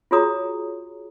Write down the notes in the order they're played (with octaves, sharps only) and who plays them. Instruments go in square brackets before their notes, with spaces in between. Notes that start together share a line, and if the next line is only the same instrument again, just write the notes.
[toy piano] F4 F#4 G#4 C#5 A#5 D#6